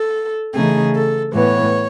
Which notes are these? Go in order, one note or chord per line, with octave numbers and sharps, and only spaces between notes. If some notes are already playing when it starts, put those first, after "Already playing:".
Already playing: A4
C#3 E3 A3 D#4 G#4
A4
A2 E3 B3 C#5